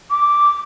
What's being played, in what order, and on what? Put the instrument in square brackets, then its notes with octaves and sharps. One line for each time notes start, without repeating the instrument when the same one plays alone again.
[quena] D6